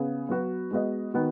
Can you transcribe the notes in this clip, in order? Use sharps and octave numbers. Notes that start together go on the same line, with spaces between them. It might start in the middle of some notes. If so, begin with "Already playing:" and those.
Already playing: C#3 B3 G#4
F#3 B3 F#4 B4
G#3 B3 F#4 D#5
D#3 B3 F#4